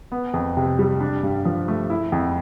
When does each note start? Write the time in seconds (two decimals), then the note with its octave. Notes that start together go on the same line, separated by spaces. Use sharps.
0.12 B3
0.34 F2
0.57 C3
0.79 G3
1.01 D4
1.23 G2
1.45 F3
1.68 A3
1.90 E4
2.12 F2